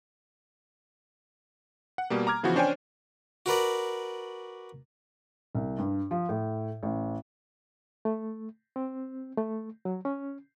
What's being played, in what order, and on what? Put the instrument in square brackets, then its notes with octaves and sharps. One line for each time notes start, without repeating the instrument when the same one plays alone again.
[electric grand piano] F#5
B2 G3 A#3
A#5 D6 F6 G#6
C#3 E3 F3 B3 F#4
C#4 D4 C5 C#5 G5 G#5
[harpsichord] F#4 A#4 B4 D5
[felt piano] C2
G2
F3
A2
A1
[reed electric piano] A3
C4
A3
F#3
C#4